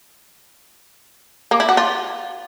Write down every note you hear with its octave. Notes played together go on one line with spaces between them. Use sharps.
A#3
E4
F#4
F4